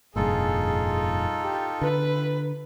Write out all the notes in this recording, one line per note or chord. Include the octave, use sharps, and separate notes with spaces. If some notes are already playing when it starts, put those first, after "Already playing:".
F1 G2 A#2 D#4 F4 G#4 A4
G4
D3 B4